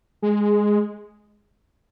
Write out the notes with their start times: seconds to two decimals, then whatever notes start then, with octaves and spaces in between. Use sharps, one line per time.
0.22 G#3